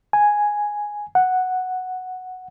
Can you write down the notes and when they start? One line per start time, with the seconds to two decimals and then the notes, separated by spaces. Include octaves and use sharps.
0.13 G#5
1.15 F#5